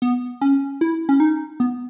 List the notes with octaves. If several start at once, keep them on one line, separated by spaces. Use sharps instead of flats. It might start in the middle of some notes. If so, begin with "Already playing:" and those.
B3
C#4
E4
C#4
D#4
B3